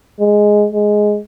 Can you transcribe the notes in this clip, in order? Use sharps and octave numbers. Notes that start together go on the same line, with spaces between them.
G#3
G#3